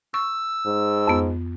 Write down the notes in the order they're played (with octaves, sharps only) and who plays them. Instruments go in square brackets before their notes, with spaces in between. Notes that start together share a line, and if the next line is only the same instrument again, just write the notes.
[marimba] C#6 [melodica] E6
[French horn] G#2
[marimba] F2 B3